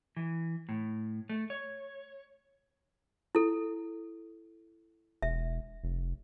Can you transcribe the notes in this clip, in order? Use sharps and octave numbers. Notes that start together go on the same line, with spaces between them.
E3
A2
A3
C#5
E4 A4
E1 E5
F1